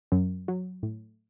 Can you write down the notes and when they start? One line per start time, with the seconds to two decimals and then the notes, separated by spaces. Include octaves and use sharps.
0.12 F#2
0.48 F#3
0.83 A2